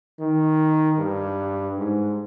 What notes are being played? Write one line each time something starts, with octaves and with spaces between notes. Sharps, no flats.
D#3
G2
G#2